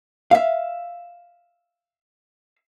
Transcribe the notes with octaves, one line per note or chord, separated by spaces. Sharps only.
E5 F5